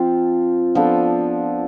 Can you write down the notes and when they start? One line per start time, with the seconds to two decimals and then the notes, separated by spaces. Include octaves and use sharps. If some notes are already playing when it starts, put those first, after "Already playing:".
Already playing: F3 C4 F4
0.75 F3 B3 D4 A4